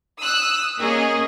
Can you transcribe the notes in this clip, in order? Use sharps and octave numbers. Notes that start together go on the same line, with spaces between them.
D#6 E6 F#6
A#3 C#4 G#4 D#5